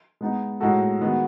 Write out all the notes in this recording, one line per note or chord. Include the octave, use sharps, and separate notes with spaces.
G#3 B3 D#4
A2 G#3 D#4 F#4 A4
D#3 G#3 B3 F#4